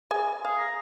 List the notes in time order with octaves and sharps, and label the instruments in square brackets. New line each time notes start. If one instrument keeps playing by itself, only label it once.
[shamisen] G#4 G#5
[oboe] G#4 [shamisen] F5
[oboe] A#5